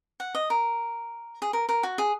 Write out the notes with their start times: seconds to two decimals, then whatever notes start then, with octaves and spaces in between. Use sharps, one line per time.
0.20 F#5
0.35 D#5
0.50 A#4
1.42 G#4
1.53 A#4
1.69 A#4
1.83 F#4
1.98 G#4